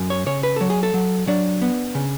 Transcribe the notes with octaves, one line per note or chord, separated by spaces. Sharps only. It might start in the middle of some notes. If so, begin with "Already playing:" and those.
Already playing: F#2
C#5
C#3 C#5
B4
F#3 A4
G#4
A4
F#3
F#3 D4
B3
C#3